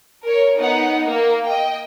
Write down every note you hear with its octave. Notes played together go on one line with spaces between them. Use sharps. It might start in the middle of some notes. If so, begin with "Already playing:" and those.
A#4 C#5
B3 D#4 F#5
A#3
D#5 G5